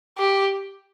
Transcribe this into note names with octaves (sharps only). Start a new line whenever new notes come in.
G4